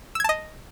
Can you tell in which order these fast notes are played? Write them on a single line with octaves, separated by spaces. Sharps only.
E6 G#6 A5 D#5